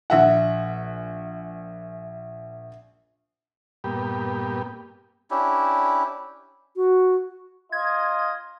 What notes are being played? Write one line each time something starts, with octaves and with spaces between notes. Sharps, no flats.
A#1 E5 F#5
G2 A#2 B3 G4
C#4 D4 E4 G4
F#4
F4 D#5 G#6